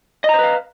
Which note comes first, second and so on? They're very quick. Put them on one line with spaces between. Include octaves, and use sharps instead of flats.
D#5 A#5 C5 B4 F5